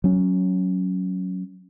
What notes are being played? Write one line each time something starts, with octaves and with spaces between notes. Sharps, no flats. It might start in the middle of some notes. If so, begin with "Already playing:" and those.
F#3 C#4